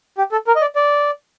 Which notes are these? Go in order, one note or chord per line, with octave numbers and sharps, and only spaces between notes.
G4
A4
A#4
D#5
D5
D5